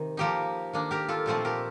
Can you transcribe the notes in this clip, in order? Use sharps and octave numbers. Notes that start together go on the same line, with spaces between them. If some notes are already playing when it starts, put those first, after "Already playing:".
Already playing: C3 D#3
F3 A#3 D#4 G4 A#4
D#3 A#3 D4
G4 A#4
F4 A4
A#2 F3 A3 C4 A4 C5
G4 A#4